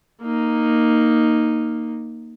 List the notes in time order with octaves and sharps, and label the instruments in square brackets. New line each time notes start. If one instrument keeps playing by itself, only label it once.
[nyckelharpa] A#3 D#4